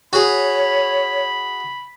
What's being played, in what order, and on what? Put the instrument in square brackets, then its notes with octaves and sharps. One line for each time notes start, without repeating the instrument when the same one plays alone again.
[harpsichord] F#4 G#4 [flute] C#5 [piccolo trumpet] B5